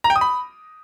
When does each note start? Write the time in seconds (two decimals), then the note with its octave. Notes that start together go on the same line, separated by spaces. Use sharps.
0.04 A#5
0.10 G5
0.16 D#6
0.21 B5